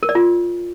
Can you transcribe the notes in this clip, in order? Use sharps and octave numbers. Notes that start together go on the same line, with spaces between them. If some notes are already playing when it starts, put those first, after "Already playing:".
A#4
D5
F4